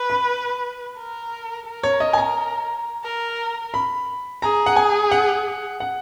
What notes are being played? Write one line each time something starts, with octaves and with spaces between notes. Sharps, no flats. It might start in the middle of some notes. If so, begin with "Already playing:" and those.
Already playing: B4
B5
A#4
A#4
C#5
D#5
G#5
A#5
A#4
B5
G#4 A#5
F#5
G#5
F#5
F#5